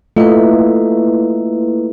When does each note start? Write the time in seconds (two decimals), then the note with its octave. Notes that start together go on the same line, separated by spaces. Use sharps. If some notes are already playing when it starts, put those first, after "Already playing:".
0.17 A3 A#3 E4 F4 B4 D#5